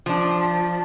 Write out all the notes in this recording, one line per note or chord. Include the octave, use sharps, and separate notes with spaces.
F3 D4